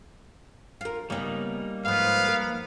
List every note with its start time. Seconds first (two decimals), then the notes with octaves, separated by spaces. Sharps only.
0.81 F4 A#4
1.10 C#3 G3 A#3 B3 D#4
1.85 G#2 F3 B3 F5
2.28 A#4